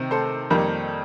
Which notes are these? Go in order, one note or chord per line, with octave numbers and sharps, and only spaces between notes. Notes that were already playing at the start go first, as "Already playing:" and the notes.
Already playing: C3 D#3 C4
A4 C5
F2 D#3 G3 A#3